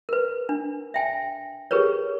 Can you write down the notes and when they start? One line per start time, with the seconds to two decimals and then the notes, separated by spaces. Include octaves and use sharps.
0.09 A#4 B4
0.49 D4
0.94 E5 G5 G#5
1.71 G4 G#4 A#4 B4 C#5